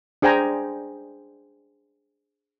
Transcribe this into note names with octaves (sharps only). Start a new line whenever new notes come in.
D4 G#4 C5 G5 G#5 A#5